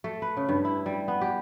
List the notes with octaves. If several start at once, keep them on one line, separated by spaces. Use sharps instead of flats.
A3
B4
C#3
G2
E4
G3
B3
G4